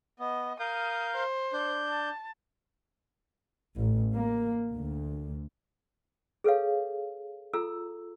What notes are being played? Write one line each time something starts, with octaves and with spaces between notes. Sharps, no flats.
B3 D#5
A#4 F5 D#6 G6
C5
D4 G6
A5
A1
A#3
D2
G#4 A4 B4 C#5 F5
F4 A4 A#5 E6